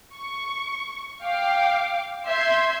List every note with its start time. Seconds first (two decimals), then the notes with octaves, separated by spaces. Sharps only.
0.15 C#6
1.23 F5 G5 D6
2.26 E5 C6 G6 G#6